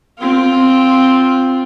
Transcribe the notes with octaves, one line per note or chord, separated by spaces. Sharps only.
C4 F4